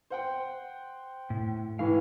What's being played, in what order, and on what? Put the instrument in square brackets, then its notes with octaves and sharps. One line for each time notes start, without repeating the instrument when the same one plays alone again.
[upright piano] C5 F#5 G5
[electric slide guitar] A2
[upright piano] A2 E3 [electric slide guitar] F5